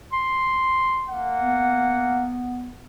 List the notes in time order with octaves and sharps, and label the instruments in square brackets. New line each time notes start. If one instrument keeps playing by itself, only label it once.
[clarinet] C6
[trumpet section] A#3 F#5
[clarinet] B3